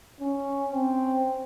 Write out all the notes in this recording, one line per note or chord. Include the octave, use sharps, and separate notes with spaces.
C#4
C4